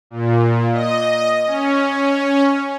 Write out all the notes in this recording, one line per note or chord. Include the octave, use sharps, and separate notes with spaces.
A#2
D#5
C#4